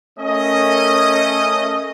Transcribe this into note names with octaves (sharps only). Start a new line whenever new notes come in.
A3 C#4 A#4 D#5